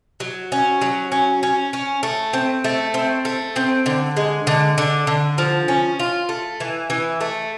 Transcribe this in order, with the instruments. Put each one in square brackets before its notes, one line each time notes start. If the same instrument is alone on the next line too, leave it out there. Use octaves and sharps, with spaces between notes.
[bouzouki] F#3
C#4
F#3
C#4
C#4
C#4
A3
C4
A3
C4
A3
C4
D3
G#3
D3
D3
D3
F3
C#4
F4
A3
E3
E3
A3